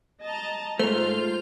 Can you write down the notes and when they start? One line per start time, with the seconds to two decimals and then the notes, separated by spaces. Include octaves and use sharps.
0.24 D#5 A5 A#5
0.79 G#2 A3 F4 C5 F7